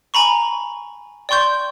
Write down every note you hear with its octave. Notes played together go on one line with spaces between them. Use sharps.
G#5 A#5 B5 C#6
D5 G5 C6 C#6 G6